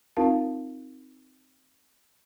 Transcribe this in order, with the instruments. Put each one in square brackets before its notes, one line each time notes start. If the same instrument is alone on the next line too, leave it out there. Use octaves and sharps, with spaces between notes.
[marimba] C4 D#4 F4 A#4 F5 A5